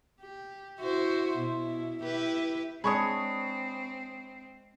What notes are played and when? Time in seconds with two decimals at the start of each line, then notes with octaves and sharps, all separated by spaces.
0.21 G4
0.79 E4 F#4 C5
1.36 B2 E4
2.03 E4 G4 B4
2.84 G#3 C4 D4 C#5 B5 C#6 D#6